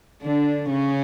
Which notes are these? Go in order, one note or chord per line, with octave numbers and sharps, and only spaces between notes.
D3 D4
C#3 C#4